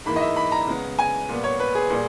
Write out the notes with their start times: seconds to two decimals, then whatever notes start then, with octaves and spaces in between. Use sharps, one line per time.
0.06 G#2 E3 A#3 B5
0.16 D#5
0.21 E5
0.36 B5
0.52 A#5
0.67 C#3 G#3 B3
0.99 G#5
1.29 A#2 G3 B3
1.44 C#5
1.60 B4
1.75 G#4
1.90 A#2 G3